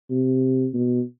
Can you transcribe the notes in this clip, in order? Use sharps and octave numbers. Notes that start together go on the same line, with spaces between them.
C3
B2